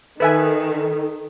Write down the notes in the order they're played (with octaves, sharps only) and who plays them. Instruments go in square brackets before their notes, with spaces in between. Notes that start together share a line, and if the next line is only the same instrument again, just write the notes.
[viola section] D#3 [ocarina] A4 [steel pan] B4 E5 G#5